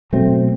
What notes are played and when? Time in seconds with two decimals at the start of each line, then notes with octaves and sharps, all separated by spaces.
0.13 B2 F#3 A3 C4